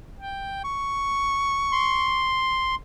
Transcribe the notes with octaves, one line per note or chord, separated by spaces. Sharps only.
G5
C#6
C6